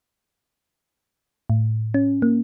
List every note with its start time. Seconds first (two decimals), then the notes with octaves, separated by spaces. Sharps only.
1.50 A2
1.94 C#4
2.22 A#3